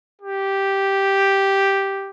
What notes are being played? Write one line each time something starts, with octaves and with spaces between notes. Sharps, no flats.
G4